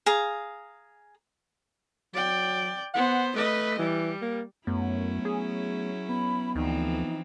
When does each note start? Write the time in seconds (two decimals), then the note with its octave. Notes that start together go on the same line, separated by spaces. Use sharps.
0.06 G#4 F5 A#5
2.14 F#3 D5 G5
2.94 B3 C5 F#5
3.36 A3 B4 D#5
3.79 E3 G3
4.22 A#3
4.67 F#2 F#3 A3 B3 C#4 E4
5.25 G#4
6.09 B3 B5
6.55 D2 E3 F3 C4 D#4